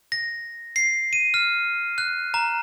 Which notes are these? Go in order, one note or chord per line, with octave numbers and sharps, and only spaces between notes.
A#6
C7
D#7
F6
F#6
A#5